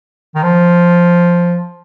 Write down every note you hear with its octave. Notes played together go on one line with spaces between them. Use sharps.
D#3
F3